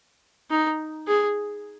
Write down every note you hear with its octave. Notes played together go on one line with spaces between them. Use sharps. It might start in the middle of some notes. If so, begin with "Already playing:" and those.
D#4
G#4